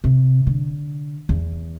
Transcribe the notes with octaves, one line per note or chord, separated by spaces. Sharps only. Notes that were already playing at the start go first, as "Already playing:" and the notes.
C3
D3
E2